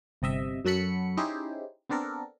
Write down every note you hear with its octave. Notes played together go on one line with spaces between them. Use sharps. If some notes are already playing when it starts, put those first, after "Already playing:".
G1 C3 D#5 E5
F#2 F#3 F#4 A4 B5 C#7
C#4 D#4 E4 G4 G#4 C5
B3 C4 D4 A4 A#4